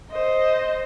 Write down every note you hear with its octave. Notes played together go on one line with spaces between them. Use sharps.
C5 D#5